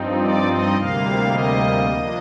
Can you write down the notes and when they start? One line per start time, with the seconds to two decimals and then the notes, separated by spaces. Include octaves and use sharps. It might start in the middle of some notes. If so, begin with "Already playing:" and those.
Already playing: G2 F3 C4 D#4
0.19 D5
0.48 D#5
0.76 D2 C3 G3 A#3 F5
1.32 D#5
1.89 F3 A#3 D4